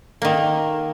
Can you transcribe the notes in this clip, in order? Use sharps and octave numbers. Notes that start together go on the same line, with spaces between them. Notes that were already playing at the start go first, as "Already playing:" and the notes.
D#3 A#3